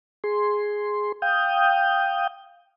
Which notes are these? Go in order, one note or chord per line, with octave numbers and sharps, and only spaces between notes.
G#4 C6
F5 G5 D#6 G6